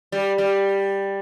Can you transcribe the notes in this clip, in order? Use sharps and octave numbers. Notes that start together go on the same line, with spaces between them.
G3
G3